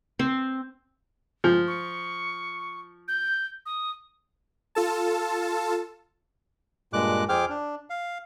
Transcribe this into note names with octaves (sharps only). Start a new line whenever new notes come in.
C4
F3
C#6
G6
D#6
F4 A4 A5
G2 A#2 G#3 D6 F#6
F2 C4 G#4 G5 D6 F6
D4
F5